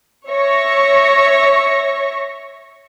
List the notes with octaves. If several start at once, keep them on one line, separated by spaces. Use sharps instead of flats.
C#5 E5 C#6 A#6